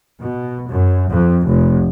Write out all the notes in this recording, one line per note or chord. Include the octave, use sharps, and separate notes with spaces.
B2
F#2
F2
F1